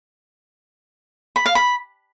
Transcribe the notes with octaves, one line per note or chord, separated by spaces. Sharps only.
B5
F5
B5